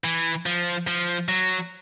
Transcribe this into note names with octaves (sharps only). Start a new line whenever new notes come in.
E3
F3
F3
F#3